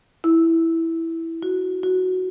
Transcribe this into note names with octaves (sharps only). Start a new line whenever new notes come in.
E4
F#4
F#4